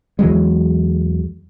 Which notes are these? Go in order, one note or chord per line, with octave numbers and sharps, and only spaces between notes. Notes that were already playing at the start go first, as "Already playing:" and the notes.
E2 E3 F#3 G#3